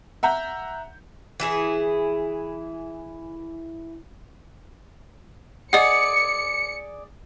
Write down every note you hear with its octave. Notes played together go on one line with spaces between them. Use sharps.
E5 F#5 A#5 G6
E3 E4 G#4
G#4 D5 D#5 F#5 C#7